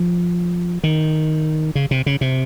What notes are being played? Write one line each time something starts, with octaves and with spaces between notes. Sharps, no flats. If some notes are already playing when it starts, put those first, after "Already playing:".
Already playing: F3
D#3
C#3
C3
C#3
C3